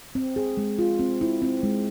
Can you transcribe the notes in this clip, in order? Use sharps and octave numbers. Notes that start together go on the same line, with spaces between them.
C4
G#4
G#3
F4
C4
E4
C4
G#3